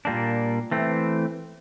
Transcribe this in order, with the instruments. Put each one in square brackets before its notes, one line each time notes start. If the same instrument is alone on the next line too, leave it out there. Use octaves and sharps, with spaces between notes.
[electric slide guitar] A#2 G3 A#3 D4
E3 A3 C4